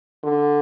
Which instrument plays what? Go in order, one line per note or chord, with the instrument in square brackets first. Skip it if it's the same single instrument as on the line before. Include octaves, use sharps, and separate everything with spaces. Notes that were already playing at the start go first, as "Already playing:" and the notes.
[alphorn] D3